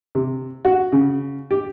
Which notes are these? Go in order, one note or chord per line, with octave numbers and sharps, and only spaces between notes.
C3
F#4
C#3
G4